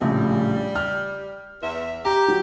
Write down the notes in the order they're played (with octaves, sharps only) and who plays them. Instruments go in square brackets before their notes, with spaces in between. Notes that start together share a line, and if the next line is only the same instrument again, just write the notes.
[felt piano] A#1 A2 C#3 [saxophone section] G3
[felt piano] F6
[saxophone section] E2 E5
[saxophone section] G4 [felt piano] A#5
[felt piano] F#3